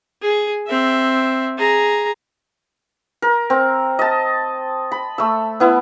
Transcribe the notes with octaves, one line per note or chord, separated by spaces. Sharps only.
G#4
C4 E5
G#4 A#5
A#4
C4
D#5 A5
B5
A3 E6
B3 E4